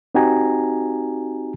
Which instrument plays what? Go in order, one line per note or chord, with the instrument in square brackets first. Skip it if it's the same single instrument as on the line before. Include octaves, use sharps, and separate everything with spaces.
[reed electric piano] C4 D#4 F#4 G4 G#5 A#5